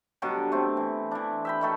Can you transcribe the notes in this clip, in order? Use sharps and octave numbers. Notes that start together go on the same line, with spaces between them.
B2 D3 F#3 G3
A3 C4
E3
E3 D4
E5 G5 B5
D#3 A3 A4